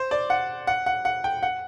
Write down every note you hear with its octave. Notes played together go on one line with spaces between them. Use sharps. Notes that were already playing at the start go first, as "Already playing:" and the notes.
Already playing: C5
D5
F#5
F#5
F#5
F#5
G5
F#5